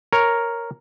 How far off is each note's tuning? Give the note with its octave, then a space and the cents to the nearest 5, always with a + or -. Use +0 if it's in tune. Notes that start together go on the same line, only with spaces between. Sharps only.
A#4 +0 C#5 +0